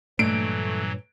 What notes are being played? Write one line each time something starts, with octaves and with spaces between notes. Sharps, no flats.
G2 A#2 E3 F#3 A3 D4 D7